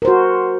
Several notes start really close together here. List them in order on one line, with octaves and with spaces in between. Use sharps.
A#4 C5 F#4